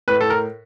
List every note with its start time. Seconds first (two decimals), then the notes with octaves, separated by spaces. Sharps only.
0.08 A2 B4
0.21 A4
0.30 A#4